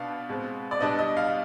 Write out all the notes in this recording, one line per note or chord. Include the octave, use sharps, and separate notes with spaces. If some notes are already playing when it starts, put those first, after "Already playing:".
Already playing: B2 B3 D4 F5
B2 G#3 C4
D5
B2 G3 B3 D4 D#5
D#5
F5